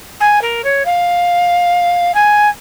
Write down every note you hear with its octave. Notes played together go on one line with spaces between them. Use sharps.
G#5
A#4
C#5
F5
G#5